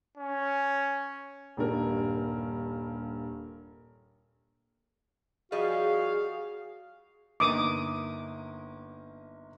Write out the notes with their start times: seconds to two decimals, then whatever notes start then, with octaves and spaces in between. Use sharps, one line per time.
0.17 C#4
1.57 D#1 G2 A#4
5.52 F3 G3 F#4 G#4 D#5 F5
7.40 G1 A#3 D#4 D6 D#6